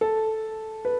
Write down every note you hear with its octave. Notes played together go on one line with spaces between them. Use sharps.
A4
B4